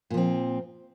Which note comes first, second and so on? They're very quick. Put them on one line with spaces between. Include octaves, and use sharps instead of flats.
A#2 F3 C4